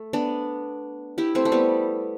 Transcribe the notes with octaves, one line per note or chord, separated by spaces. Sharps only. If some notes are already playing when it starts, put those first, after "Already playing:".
Already playing: A3
B3 D4
E4 G4
A3 C4
A3
G3 B3